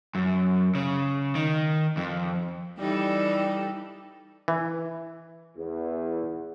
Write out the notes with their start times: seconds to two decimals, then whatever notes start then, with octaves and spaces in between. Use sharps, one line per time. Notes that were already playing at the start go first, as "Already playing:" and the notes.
0.15 F#2
0.75 C#3
1.35 D#3
1.97 F2
2.78 E3 G3 D#4 A4
4.48 E3
5.56 E2